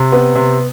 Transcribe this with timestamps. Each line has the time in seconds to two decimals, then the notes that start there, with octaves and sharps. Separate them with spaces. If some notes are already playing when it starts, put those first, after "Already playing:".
Already playing: C3
0.12 B3
0.36 C3